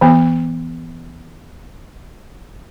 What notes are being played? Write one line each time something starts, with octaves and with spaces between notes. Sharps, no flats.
E3 B3